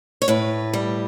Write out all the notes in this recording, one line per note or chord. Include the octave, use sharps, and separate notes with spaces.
C#5
A2 B4
G3